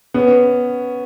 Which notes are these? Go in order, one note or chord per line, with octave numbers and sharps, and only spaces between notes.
B3 C#4